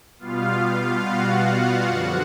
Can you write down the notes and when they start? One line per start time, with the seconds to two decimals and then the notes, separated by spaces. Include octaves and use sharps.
0.19 B2 G3 B3 F4 F5
1.03 F#4 F#5
1.88 F#2 D3 F3